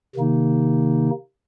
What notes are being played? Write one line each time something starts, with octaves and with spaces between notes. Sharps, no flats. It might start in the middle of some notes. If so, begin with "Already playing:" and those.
C3 D#3 A#3 D#4